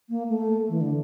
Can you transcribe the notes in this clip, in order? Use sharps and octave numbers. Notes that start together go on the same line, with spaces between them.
A#3
A3
E3
D3